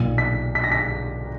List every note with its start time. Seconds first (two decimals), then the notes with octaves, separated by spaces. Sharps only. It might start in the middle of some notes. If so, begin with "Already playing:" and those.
Already playing: B1 A#2
0.18 B6
0.55 B6
0.64 A#6
0.72 B6